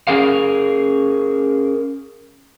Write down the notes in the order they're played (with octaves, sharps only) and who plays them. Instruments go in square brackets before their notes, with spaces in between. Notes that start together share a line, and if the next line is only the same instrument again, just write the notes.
[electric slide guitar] C#4 G#4 A#4 F5